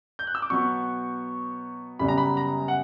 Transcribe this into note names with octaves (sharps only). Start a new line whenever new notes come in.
G6
F#6
E6
D6
B2 F#3 B3 C#6
F#2 C#3 G3 B3 B5
A#5
B5
A#5
F#5